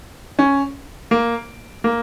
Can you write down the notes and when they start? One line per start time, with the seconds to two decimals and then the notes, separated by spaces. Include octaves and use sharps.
0.39 C#4
1.11 A#3
1.84 A#3